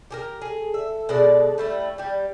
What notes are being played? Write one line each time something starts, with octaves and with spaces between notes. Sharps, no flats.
G4 G#4 A#4
G#4 A4
E5
B2 G#3 D5
G3 A3 E4
G3 G4